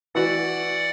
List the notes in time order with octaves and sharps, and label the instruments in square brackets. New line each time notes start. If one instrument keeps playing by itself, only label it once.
[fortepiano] E3 F#4 [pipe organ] D5 F#5